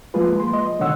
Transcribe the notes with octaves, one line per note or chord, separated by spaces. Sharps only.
F3 G#3 A#3 F4 G#4 B4
C6
D#5
B2 D3 D#3 C#5 F#5 E6